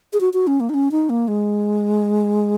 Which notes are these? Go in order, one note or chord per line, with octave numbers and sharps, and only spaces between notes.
G#4
F#4
F#4
C#4
A#3
D#4
C#4
D#4
A#3
G#3